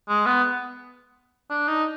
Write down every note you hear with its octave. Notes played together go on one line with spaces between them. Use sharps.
G#3
B3
D4
D#4